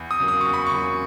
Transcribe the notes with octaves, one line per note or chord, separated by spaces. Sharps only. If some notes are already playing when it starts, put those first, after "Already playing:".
Already playing: E2
D#6
C#3 F#3 A#3
D#6
E2 C#6
B5
C#6
C#3 F#3 A#3